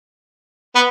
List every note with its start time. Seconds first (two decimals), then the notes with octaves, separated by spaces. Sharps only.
0.75 B3